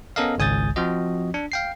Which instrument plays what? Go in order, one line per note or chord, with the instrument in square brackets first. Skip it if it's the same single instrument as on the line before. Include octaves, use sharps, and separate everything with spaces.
[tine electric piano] B3 C#4 A4 A#4 D#5 F5
G#1 C#2 G#5 D#6 G6 A6
F3 C4 F#4 D#5
D4
F5 G5 C7